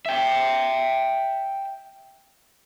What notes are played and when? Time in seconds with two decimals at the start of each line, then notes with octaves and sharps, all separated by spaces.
0.06 E5 G5